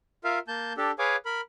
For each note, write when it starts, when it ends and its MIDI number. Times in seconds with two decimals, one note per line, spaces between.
0.24 0.39 65
0.24 0.39 70
0.24 0.39 76
0.24 0.39 77
0.48 0.73 58
0.48 0.73 81
0.48 0.73 91
0.77 0.91 62
0.77 0.91 67
0.77 0.91 69
0.99 1.16 68
0.99 1.16 71
0.99 1.16 73
0.99 1.16 77
0.99 1.16 80
0.99 1.16 86
1.26 1.41 70
1.26 1.41 83